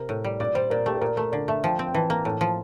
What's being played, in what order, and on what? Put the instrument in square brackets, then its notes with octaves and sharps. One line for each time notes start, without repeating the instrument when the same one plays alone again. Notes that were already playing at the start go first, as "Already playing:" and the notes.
Already playing: [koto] C3 [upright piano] A#4
[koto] A2
G3
[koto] A#2 [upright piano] D5
[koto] G3 [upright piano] C5
[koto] A#2 [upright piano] A#4
[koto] A3 [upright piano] G4
[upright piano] A4
[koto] A#2 [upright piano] A#4
[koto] A3 [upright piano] A#4
[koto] D3 [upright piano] D5
[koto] A3 [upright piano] E5
[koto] F3 [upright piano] G5
[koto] C4
[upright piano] G5
[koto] E3 [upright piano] A5
[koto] A#3 [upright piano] A#5
[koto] A2 [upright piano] A5
[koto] F3